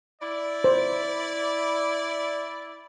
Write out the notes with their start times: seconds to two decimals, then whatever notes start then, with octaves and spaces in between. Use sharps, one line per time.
0.21 E4 D5
0.64 C5